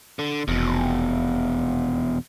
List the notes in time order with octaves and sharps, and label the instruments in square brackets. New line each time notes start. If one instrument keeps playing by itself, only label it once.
[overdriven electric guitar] D3
[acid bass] F1 [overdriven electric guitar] E2 B2